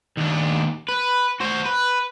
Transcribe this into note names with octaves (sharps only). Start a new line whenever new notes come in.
D#2 D4
B4
F#4 C5
B4